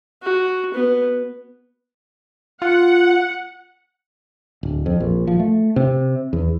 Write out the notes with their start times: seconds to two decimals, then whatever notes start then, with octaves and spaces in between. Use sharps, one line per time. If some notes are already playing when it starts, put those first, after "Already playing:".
0.23 F#4
0.74 B3
2.62 F4 F#5
4.63 D1
4.86 F2
5.00 A#1
5.27 F3
5.40 A3
5.76 C3
6.33 E2